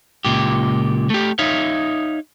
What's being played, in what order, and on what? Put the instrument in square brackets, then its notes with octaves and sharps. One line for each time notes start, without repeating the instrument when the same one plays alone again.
[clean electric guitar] C#2 A#2 G4
A3 G4
D#4 C#5 E5 F5